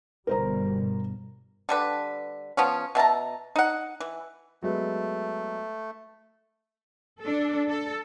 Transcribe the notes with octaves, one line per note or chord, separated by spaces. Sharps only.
G1 B2 G3 A#4 C5 A#5
D3 G3 B4
F3 B3 C#4
B2 E5 A5 A#5
D#4 F#5
E3
F#3 G#3 A3 B3
D4 A4
A4